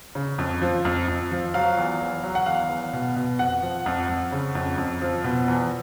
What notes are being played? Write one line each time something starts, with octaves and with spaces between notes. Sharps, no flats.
C#3
F2
F3
F2
F2
F3
F#3 F5
E2
E2
F#3
F#5
E2 F5
E2
B2
B2
F2 F#5
F3
F2
F2
C#3
F2
F2
F3
B2
E2